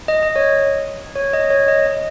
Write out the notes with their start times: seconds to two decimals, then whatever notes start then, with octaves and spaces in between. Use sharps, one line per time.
0.08 D#5
0.23 D#5
0.36 C#5
1.16 C#5
1.33 D#5
1.50 C#5
1.68 D#5
1.87 D#5